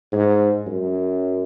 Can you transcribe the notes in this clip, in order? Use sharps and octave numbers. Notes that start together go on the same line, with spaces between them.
G#2
F#2